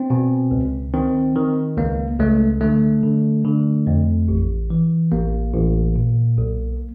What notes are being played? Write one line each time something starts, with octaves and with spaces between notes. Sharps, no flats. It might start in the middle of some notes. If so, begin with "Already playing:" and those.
Already playing: C4
B2
C#2
D#3 C4
D#3
C#2 A#3
C#2 A3
D3 A3
D3
D3
F2
A1
E3
A1 A#3
A1
A#2
B1